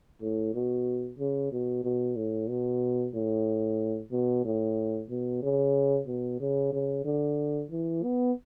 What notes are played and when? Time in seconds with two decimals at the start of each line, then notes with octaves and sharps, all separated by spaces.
0.21 A2
0.54 B2
1.19 C#3
1.52 B2
1.84 B2
2.16 A2
2.49 B2
3.14 A2
4.12 B2
4.45 A2
5.10 B2
5.43 C#3
6.07 B2
6.40 C#3
6.73 C#3
7.05 D3
7.71 E3
8.03 B3